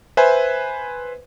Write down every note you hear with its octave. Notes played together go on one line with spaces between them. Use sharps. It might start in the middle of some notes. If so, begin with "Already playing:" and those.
B4 C5 E5 G#5